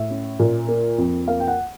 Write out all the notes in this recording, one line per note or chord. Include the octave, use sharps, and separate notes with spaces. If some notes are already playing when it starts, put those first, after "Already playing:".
Already playing: A2 E5
C#4
A#2
A#3
F2
A#3 F5
G5
F#5